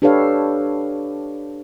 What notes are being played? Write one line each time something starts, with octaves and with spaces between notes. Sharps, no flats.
D4 G4 A4 B4 C#5 F5